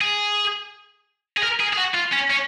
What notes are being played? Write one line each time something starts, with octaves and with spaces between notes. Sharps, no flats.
G#4
G#4
A#4
G#4
G#4
F#4
F4
C#4
C#4